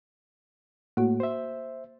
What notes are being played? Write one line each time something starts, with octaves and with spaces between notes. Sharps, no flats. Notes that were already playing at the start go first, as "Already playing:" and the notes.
A2 A#3 F#4
C5 E5